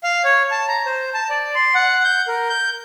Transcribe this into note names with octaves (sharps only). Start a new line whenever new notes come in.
F5
C#5
A5
A#5
C5
A5
D5
C6
F#5
G6
A#4
G6